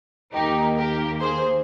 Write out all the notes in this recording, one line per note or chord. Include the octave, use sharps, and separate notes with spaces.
D#2 D#3 A#3 D#4 G4
G4 A#4
G#4 C5